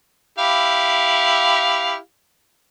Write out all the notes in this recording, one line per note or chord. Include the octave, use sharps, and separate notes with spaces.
E4 G4 F5